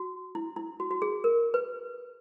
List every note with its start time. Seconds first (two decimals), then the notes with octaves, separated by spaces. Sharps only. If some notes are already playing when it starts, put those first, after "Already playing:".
Already playing: F#4
0.35 E4
0.56 E4
0.80 F#4
0.91 F#4
1.02 G#4
1.24 A#4
1.54 B4